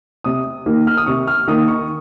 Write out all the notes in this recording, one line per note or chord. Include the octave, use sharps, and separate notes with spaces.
C3 D#6
D#3 A#3
F6
D#6
C3 C#6
F6
D#3 A#3 D#6
C#6